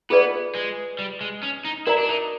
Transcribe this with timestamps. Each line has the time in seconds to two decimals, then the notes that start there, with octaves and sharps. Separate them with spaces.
0.10 B3 F4 G#4 B4 D5
0.55 G#3
0.99 G3
1.21 G#3
1.43 C#4
1.65 D#4
1.87 E4 F#4 A#4 D5 F5 A#5
1.98 D4
2.09 D#4